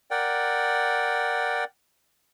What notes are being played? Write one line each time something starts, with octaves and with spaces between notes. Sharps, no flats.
A#4 D5 F#5 G5